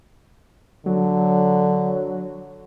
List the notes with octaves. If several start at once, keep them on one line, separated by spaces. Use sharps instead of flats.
D3 F#3